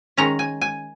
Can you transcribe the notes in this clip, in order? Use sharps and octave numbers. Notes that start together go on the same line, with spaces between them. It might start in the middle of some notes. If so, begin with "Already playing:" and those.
D#3 G#3 C#4 A#5
G#5
G#5